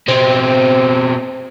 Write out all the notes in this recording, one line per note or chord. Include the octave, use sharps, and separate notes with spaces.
B2 C4